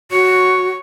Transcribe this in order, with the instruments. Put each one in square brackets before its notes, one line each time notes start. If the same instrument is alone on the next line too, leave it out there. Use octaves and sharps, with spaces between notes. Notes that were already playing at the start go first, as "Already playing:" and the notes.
[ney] F#4 [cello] C#5